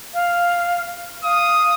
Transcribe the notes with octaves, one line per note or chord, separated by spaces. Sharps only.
F5
F5 D#6